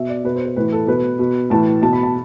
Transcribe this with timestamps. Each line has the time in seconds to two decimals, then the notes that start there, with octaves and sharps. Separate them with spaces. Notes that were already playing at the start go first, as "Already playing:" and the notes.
Already playing: B2 E5
0.09 D5
0.24 B2 B4
0.36 C5
0.45 B4
0.56 A2 E3 B4
0.72 A4
0.87 B2 B4
1.19 B2
1.50 A2 E3 A5
1.82 B2 A5
1.93 B5
2.03 A5